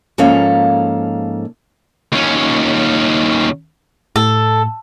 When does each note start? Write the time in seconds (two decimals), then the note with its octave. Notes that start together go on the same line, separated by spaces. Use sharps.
0.18 G#2 F3 A#3 C#4 A4 F5
2.12 D#2 C#4
4.16 A2 A4